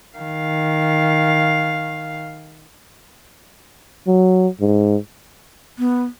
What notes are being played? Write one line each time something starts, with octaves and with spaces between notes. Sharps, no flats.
D#3 F5
F#3
G#2
B3